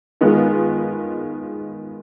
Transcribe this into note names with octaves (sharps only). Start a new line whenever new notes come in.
D#3 G#3 B3 F4 G#4